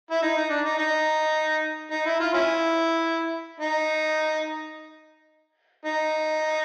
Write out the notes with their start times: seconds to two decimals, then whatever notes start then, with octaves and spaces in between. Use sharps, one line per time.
0.11 E4
0.23 D#4
0.37 D#4
0.50 D4
0.65 D#4
0.79 D#4
1.91 D#4
2.06 E4
2.20 F4
2.34 C#4 E4
3.60 D#4
5.86 D#4